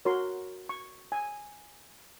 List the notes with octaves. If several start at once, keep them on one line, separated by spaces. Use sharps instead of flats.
F#4 A#4 C#5 C6
C#6
G#5